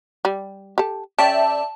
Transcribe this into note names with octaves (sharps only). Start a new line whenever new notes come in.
G3
G4 A4
C#3 D5 E5 G5 A5